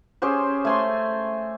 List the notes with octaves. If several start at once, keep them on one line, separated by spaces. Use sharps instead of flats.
C#4 G4 G#4 C5
A3 G#5 C6